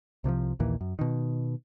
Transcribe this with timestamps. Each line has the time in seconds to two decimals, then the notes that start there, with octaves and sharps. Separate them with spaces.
0.24 C2 C3 E3 F3
0.59 A#1 D#2 A#2 E3
0.81 F#2
0.99 B2 D#3